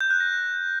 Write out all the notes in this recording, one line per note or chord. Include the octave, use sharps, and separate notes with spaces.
G6
F#6
A#6